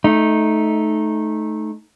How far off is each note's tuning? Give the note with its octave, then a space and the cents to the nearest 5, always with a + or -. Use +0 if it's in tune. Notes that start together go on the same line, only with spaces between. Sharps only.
A3 -15 D#4 +0